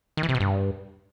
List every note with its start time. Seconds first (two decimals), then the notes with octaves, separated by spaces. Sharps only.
0.17 D#3
0.23 E3
0.29 C3
0.35 B2
0.40 G2